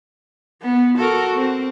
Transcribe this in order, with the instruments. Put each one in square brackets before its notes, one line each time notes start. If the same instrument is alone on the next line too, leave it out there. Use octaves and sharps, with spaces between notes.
[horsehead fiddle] B3
[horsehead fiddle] F#4 [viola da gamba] A4 A#4
[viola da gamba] C4